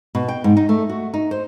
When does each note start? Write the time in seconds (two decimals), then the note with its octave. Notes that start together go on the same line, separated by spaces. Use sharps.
0.15 B2
0.28 G5
0.44 G#2
0.57 D#4
0.69 A3
0.89 F#4
1.14 D#4
1.31 C5